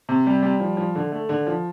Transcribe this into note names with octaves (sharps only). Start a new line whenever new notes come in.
C3
G3
G3
F3
F3
D3
A3
D3
F3